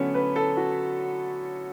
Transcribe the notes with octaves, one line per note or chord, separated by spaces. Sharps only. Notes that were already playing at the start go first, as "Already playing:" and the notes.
Already playing: D3 F#3 A3 B3 C#4
B4
A4
F#4